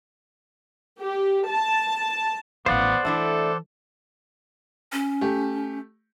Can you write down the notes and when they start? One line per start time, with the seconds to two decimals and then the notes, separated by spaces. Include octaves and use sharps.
1.00 G4
1.49 A5
2.66 A1 E3 B3 C5 D5 F5 F#5
3.05 E3 A3 D4 E4 A4
4.92 C#4
5.21 A3 G4